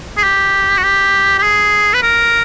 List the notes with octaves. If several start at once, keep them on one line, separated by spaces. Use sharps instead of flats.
G#4
G4
F#4
G4
G4
G#4
B4
A#4